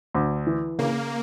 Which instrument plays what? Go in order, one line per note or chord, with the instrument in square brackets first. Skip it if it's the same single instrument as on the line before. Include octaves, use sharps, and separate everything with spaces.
[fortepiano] D2
E3
[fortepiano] C#3 [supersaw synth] A#3